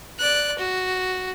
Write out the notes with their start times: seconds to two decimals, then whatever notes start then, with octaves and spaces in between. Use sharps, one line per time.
0.19 D5 F#6
0.58 F#4